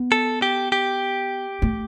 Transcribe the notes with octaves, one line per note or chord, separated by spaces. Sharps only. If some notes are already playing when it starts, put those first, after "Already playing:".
Already playing: B3
A4
G4
G4
A3